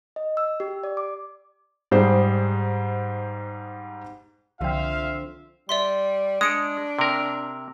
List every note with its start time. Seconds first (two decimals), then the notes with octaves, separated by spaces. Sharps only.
0.16 D#5
0.37 E6
0.60 G4
0.84 D5
0.97 D6
1.91 G#2 G3 G#4 C5
4.61 C2 D3 F3 C4 F4 E5 F5 G5
5.69 G3 D5 E5 C6
6.41 G#3 D4 D#6 C#7 D7
6.99 C3 A#4